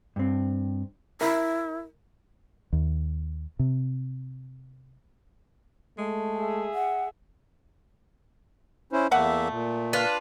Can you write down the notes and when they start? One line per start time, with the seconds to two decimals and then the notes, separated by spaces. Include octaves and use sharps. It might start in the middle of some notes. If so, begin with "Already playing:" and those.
0.16 G2 C4
1.21 E4 A#4 E5 B5
2.73 D#2
3.59 C3
5.98 G#3 A3
6.36 G#4 E5
6.74 F#5
8.93 C#4 E4 C5
9.11 E2 G3 A3 A#3 E5 F#5
9.50 A#2
9.93 D4 F4 B4